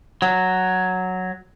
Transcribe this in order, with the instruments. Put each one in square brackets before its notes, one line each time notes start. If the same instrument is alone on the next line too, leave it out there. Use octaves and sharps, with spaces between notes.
[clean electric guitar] F#3